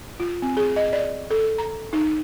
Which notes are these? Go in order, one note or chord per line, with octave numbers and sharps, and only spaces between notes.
F4
C4
G#4
D#5
D5
A4
A#5
D#4